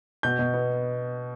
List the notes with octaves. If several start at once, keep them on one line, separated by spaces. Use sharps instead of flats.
B2 G6
B2
B3